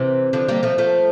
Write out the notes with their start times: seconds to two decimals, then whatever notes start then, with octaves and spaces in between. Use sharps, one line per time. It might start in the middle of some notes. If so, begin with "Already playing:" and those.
Already playing: C3 E3
0.33 D3 F3
0.48 G3 A#3
0.63 F3 A3
0.78 F3 A3